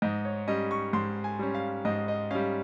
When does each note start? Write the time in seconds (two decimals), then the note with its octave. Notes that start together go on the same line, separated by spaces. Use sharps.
0.02 G#2 D#5
0.25 C#5
0.48 G3 C#4 D#5
0.71 C#6
0.93 G#2 C6
1.24 G#5
1.39 G3 C#4
1.54 F5
1.85 G#2 D#5
2.08 D#5
2.31 G3 C#4 F5